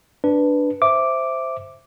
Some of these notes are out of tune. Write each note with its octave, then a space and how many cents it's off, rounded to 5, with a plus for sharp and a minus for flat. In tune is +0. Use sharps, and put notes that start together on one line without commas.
D4 +0 B4 +0
C5 +0 E5 +0 D6 +0